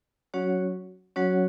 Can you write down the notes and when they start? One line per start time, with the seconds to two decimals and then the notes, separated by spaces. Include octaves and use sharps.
0.34 F#3 C#4 F#4 C#5 F#5
1.16 F#3 C#4 F#4 C#5 F#5